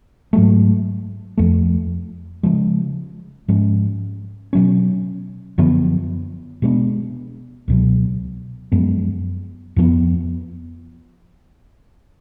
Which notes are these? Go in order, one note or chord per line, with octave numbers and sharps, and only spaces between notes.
G#2 F#3 A3
F2 F3 A3
C#3 F3 G#3
G#2 F3 G#3 C#4
B2 F#3 C#4
F#2 D3 F3 B3
B2 G#3 B3 D4
C#2 B2 F#3
F#2 F3 G#3 B3
F2 F3 B3